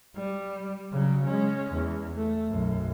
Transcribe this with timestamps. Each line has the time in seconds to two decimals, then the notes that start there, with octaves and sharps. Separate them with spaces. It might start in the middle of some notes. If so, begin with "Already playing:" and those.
0.16 G3
0.93 C#3 F#3
1.27 G#3 C#4
1.73 E2
2.16 A3
2.48 B1 F#2